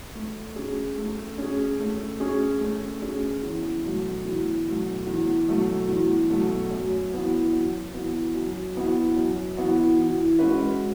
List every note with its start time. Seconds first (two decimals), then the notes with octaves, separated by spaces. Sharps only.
0.15 A3
0.56 C#4 G#4
0.97 A3
1.38 C#4 G#4
1.79 A3
2.20 C#4 G#4
2.61 A3
3.02 C#4 G#4
3.43 E2
3.84 B2 F#3 A3
4.25 E2
4.66 B2 F#3 A3
5.07 E2
5.48 B2 F#3 A3
5.89 E2
6.30 B2 F#3 A3
6.71 F#2
7.12 E3 B3 F#4
7.53 F#2
7.93 E3 B3 F#4
8.34 F#2
8.75 E3 B3 F#4
9.17 F#2
9.57 E3 B3 F#4
9.98 E3
10.39 G#3 C#4 F#4 B4